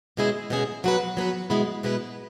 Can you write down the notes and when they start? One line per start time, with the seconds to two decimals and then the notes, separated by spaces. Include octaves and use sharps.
0.17 B2 G#3 C#4 E4 G#4
0.50 B2 G#3 C#4 E4 G#4
0.84 F#3 B3 F#4 B4
1.17 F#3 B3 F#4 B4
1.50 B2 G#3 B3 E4 B4
1.83 B2 G#3 B3 E4 B4